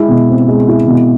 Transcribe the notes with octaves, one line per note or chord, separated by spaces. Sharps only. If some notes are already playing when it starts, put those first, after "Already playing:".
Already playing: G#3 E4
B2
C4
G#3
E4
B2